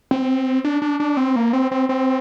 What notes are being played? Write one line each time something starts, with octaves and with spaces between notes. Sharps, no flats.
C4
D4
D4
D4
C4
A#3
C4
C4
C4